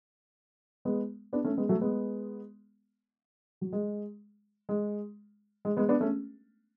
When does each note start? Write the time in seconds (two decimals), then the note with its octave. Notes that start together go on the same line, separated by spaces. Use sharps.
0.85 G#3 B3
1.33 B3 D4
1.45 A3 C#4
1.57 G#3 B3
1.69 F#3 A3
1.81 G#3 B3
3.61 F#3
3.73 G#3
4.69 G#3
5.65 G#3
5.77 G#3 B3
5.89 B3 D4
6.00 A3 C#4